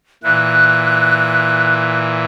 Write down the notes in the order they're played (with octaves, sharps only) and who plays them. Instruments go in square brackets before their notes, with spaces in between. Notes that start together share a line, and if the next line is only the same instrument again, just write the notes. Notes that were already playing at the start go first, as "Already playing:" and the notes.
[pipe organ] A#2 E3 [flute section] F#6